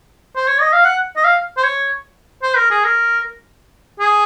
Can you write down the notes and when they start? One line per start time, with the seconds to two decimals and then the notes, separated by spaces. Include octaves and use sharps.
0.36 C5
0.48 C#5
0.61 D#5
0.73 F5
0.85 F#5
1.17 D#5
1.25 F5
1.57 C5
1.64 C#5
2.43 C5
2.57 A#4
2.71 G#4
2.84 A#4
4.00 G#4